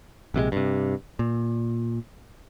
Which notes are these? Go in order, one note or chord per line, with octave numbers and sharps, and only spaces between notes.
A#1 C3 D#3 G#3
G2 C3
A#2